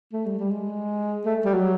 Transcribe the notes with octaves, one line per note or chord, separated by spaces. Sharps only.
A3
G3
G3
G#3
A3
G3
F#3